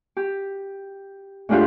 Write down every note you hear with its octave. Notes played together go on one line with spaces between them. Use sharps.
G4
A2 G#3 D4 F4 G4 F#5